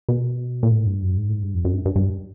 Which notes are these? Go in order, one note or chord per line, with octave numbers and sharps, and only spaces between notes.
B2
A#2
A2
G2
F#2
G#2
A2
G#2
G2
F2
F#2
G2
G2
G2